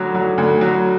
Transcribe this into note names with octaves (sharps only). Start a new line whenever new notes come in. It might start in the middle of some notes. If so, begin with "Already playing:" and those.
Already playing: D2 F#3
F#3
D2
F#3